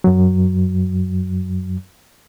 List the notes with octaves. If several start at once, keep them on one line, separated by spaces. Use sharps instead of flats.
F#2 F#3